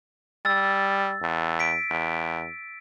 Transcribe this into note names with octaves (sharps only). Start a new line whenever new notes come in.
G3 E6 A6
E2
B6 D7
E2